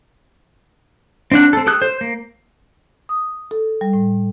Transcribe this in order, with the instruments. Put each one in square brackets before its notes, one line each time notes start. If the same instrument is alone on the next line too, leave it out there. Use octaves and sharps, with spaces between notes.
[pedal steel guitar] C4 D4 F#5
C4 A4
G4 A4 D#6 F#6
C5
A#3
[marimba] D#6
A4
G3
A2